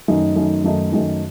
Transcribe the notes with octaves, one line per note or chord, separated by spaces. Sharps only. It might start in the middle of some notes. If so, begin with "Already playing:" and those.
F#2 D#3 A3 D#4
F#2 D#3 A3 D#4
F#2 D#3 A3 D#4
F#2 D#3 A3 D#4